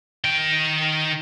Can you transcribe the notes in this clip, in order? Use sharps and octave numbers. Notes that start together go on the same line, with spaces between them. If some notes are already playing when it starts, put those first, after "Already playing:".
D#3 G5